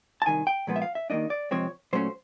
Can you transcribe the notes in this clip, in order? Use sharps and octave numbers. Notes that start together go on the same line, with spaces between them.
A5
C2 C3 D#3 G#5
G5
A#2 F3 G#3 B3
E5
F5
E5
D#2 D#3 G3 A#3 D4 D#5
D5
F2 C3 F3 G#3 C4 C#5
A#2 F#3 A3 C#4 C5